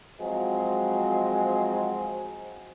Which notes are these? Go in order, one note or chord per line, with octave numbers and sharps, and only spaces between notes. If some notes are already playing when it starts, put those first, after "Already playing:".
F3 F#3 G#3 C4